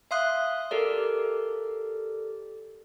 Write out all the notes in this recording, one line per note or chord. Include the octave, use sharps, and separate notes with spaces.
E5 F5 C6 D#6 F#6
G4 A4 A#4 D5